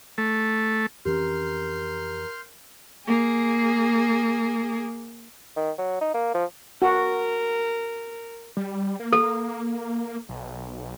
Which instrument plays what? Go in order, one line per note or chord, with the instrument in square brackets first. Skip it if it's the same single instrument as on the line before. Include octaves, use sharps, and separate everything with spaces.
[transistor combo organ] A3
[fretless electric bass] F2 E3 C#4 [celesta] G4 [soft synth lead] A#4 [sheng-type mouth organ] C6 F6 G6
[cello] A#3 G#4
[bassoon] D#3
F#3
D#4
A#3
F3
[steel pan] F#4 [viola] A#4
[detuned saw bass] G3
A#3
[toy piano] A4
[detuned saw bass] B1